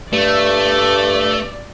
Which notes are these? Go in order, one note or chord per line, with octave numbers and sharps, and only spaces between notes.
G2 A3 D5